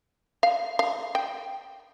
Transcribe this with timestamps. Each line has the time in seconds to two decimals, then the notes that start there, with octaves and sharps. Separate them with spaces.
0.43 F5
0.79 F5
1.15 G5